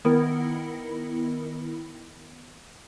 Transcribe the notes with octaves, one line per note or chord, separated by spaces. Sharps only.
D#3 B3 E4 A#4